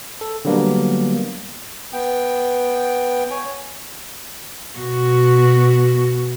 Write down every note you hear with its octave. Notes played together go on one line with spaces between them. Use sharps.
A4
D3 F#3 G3 A#3 B3 D4
B3 G5
C#5 G#5
B2 F#4